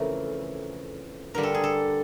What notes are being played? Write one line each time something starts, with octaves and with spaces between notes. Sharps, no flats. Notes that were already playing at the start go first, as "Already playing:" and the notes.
Already playing: F2 C#3 E3 A3 A#4
G2 D3 G3 A#4
A4
G#4
A4